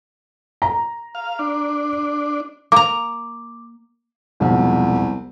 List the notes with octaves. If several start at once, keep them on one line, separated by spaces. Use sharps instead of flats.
A#5
F5
D4
A#3 A#5 D6
E1 C2 F3